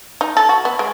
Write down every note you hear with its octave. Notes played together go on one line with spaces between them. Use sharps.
D#4
A4
F#4
B3
G#3